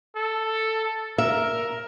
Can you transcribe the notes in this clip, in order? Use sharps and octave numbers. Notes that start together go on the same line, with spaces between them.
A4
A#4 E5